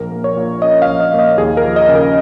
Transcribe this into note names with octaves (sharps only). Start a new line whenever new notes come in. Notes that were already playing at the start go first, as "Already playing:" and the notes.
Already playing: A#1 A#4
A#3
C#5
A#2
C#4 D#5
F5
A#1
D#5
A#3
D#5
D#2 G#4
A#4
F3
D#5
C#3
A#4